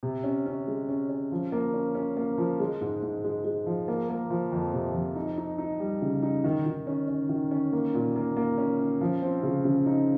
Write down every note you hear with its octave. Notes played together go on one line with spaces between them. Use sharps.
C3
C#4
C#4
G#3
C#4
C#4
F3
A#3
C#4
C#4
A#3
F3
G#3
G#2
G#2
G#3
G#3
F3
A#3
A#3
F3
F2
C3
F2
D#4
D#4
D#4
G3
C#3
D#4
D#3
D#3
C#4
C#4
D#3
C#4
A#3
A#2
A#3
A#3
C#4
C#4
F3
C4
C#3
C#3
D#4